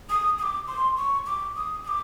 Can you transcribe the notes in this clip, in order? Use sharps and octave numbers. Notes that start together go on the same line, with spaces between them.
D#6
D#6
D6
C6
C#6
D6
D#6
D#6
D6